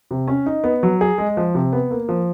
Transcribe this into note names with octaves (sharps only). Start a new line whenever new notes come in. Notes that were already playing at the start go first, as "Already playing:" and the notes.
C3
C#4
D#4
B3
F#3
G#4
G#3
F3
C3
B3
A#3
F3